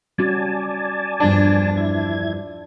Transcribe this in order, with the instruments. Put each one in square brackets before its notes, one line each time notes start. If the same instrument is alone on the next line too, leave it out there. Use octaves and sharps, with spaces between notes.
[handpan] G3 C#4 F#4 [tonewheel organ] D5 G#5 A5
[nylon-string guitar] E2 G2 F3 [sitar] D4
[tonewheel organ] E4 G#6